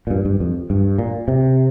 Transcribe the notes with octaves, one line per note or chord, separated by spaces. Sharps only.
A#2
G2
G2
F2
G2
A#2
C3